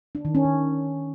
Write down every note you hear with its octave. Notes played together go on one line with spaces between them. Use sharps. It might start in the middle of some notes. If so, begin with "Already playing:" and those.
D4
D#3
C#4
D#3